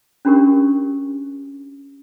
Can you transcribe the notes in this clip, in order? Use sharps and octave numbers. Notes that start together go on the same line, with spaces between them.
C#4 D4 F#4 G4 A#4 C#6